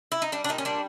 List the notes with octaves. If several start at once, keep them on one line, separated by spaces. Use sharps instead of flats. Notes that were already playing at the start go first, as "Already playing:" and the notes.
E4
D#4
G3 D4
D4
A#2 D#4
C#4
G3 D4